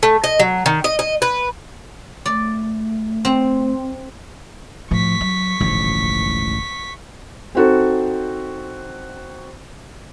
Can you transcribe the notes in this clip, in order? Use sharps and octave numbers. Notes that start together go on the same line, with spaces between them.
A3
D#5
F#3
D#3
D#5
D#5
B4
A3 D5
C4
A2 F3 C#6 B6
F#3
D#1 A1 G#2 D3 F3
C4 D#4 F#4 A4 C5